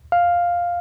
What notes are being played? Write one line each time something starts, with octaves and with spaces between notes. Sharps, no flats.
F5